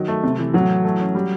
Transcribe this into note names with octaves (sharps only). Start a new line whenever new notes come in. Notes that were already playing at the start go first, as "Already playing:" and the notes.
Already playing: D#3 F#3
A3
C3
E3
A2 F#3
E3
A3
C#4
G3